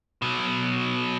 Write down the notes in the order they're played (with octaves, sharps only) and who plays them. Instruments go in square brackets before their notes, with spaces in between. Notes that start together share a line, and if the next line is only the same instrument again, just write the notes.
[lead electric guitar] B2 F#3